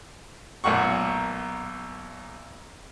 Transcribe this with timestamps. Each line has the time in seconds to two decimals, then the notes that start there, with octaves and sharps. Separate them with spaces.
0.64 B1 A#2 A#3 F#5 C#6